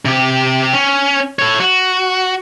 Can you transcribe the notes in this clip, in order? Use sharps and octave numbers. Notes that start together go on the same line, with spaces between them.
C3 G4
C#4
A4 C#5
F#4